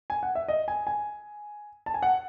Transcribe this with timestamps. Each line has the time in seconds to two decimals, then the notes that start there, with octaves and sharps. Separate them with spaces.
0.10 G#5
0.23 F#5
0.35 E5
0.48 D#5
0.68 G#5
0.87 G#5
1.86 A5
1.94 G#5
2.03 F#5